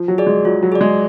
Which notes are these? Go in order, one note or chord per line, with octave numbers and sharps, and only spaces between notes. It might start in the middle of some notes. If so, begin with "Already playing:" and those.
Already playing: F3
F#3
G#4 D5
G#3
F#3 F4
F#3
G#4 D5
G#3